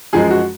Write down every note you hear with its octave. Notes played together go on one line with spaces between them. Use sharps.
F#2 F3 G#3 G#4
F#4